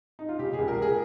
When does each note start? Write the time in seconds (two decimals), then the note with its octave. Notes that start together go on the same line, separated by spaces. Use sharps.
0.19 D#4
0.29 F4
0.39 C#3 G4
0.53 G#4
0.59 C#2
0.68 A#4
0.77 C#2
0.82 G#4